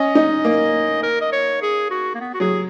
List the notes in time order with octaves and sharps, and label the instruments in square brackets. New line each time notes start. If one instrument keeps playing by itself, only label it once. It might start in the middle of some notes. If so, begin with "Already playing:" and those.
Already playing: [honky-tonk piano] C#4 [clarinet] D#5
[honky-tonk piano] D#4
A#3
[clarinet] A#4
D#5
C#5
G#4
F#4
A#3
B3
F#4
[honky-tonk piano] F#3 [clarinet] G#4